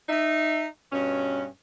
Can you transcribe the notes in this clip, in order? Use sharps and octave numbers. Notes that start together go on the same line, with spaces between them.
D#4 E5
G2 B2 C#4